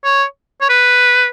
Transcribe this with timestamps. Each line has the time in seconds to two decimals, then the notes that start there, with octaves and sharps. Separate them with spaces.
0.05 C#5
0.61 C#5
0.70 B4